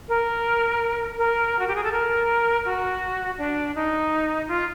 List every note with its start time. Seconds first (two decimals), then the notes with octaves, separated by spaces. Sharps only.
0.08 A#4
1.18 A#4
1.59 F#4
1.68 G4
1.75 G#4
1.84 A4
1.92 A#4
2.65 F#4
3.38 D4
3.75 D#4
4.48 F4